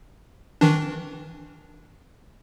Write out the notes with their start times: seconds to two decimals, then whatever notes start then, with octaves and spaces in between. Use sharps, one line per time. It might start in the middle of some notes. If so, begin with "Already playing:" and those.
0.61 D#3 E3 D4